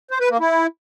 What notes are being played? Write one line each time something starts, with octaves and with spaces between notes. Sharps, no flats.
C5
B4
A#3
E4